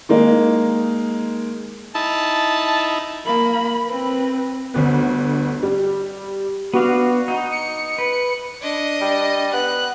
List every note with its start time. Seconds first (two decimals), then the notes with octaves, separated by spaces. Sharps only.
0.09 D#3 G#3 A#3 D#4 G#4
1.95 D#4 E4 A5
3.25 A#3 B5
3.87 C4 B4
4.74 G1 D2 B3
5.63 G3
6.74 B3 D4 F#4 F5
7.28 D#4
7.52 C#7
7.98 B4
8.62 D4 D#5
9.01 G3
9.53 B3 F#6